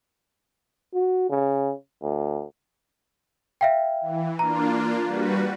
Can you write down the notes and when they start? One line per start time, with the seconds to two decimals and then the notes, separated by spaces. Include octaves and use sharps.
0.94 F#4
1.30 C#3
2.02 D2
3.61 E5 F5 G5
4.01 E3
4.39 A#3 D4 F4 A#5
5.06 G3 F#4 B4